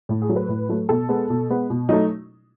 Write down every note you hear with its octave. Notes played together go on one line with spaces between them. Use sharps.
A2
G#4
F#3 A3
B4
A2
F#3 A3
B2 A4
G#3 B3
B2
G#3 B3
B2
F#3 A3 D#4